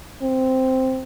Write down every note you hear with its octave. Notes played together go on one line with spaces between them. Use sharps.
C4